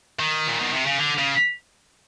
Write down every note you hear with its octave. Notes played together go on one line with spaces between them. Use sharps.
D#3
A#2
B2
C3
C#3
D3
C#3